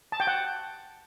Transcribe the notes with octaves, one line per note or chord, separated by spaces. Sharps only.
A5
G5
F#5